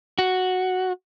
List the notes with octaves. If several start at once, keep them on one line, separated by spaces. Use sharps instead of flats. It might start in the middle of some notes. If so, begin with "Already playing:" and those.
F#4